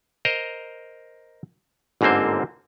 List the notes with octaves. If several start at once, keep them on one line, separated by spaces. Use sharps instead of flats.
A#4 C5 D#5 A#5
G1 G#2 D3 A#3 C4 C5